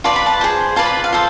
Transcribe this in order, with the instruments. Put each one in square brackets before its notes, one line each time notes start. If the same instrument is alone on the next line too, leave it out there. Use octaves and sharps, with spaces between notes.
[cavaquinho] F4 B4 D5 A5
B5
A5
G#4 C5
F4 B4 D5 A5
B5
F5
F4 A4 C5